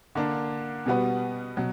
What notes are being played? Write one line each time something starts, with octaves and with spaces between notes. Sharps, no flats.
D3 A#3 D4
B2 G3 B3 F#4 B4
B2 F#3